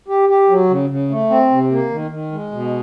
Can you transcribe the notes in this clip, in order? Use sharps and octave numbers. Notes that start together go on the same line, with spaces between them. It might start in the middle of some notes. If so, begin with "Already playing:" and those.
G4
G4
F#3
C#3
C#3
A3
C4
C3
A#3
D#3
D#3
G#3
B2